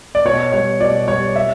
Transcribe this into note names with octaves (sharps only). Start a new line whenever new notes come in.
D5
B2 C#5
G3 C#5
B2 D5
G3 C#5
E5